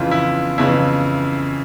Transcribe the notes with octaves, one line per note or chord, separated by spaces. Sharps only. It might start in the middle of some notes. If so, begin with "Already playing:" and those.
Already playing: F2 C#3 E3 F4
E4
F2 C#3 E3 E4